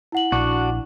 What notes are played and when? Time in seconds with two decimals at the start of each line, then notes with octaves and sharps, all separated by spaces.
0.12 E4 F#5 F#7
0.32 A#1 D4 F#4